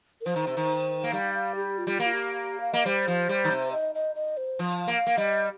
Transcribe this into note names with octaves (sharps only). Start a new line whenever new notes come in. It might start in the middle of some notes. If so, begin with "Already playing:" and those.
A#4
F3 C5
D#3
C3
D#3
A#3
G3 F5
F5
G4
F4
G3
A#3 G4
F4
G4
F5
A#3 D#5
G3 C5
F3
G3
D#3
C3
D#5
D#5
D#5
C5
F3
A#3 F5
A#3
G3 D#5